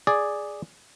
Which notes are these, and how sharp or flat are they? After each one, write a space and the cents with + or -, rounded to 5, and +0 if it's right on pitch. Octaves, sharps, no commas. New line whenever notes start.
G#4 +0 D5 +0